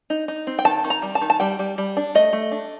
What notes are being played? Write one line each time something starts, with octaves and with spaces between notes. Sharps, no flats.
D#4
D#4
C4
G5
D#3 A5
D#3
A#5
G3
A5
D#3
A5
G3 G5
G3
G3
D4
A3 D#5
A3
D4